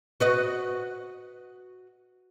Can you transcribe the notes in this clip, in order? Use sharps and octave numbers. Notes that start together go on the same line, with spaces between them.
F#4 B4 D#5